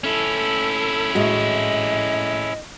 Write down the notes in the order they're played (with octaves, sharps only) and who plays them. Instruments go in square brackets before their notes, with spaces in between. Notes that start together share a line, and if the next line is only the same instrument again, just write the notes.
[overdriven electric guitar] C#4 E4 [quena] A4
[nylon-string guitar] A2 G#3 F#4 [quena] D#5